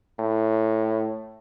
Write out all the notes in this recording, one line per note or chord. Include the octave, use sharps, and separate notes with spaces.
A2